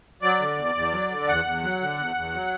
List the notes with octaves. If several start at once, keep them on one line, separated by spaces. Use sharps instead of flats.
F#3 D5
D3
E2
E2
F#3
D3
E2 F#5
E2
F#3
D3
E2
E2
F#3